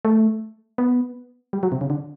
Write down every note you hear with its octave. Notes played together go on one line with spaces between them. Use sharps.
A3
B3
G3
F#3
C3
C#3
D3